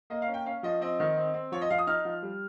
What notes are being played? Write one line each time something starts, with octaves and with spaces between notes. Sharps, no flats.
A#3 D#5
F5
C#4
G5
C#4 F5
F3 D#5
C4 D#5
D#3
C4
C4
F3 C#5
D#5
F3 F5
D#6
D#4 F6
F3
G3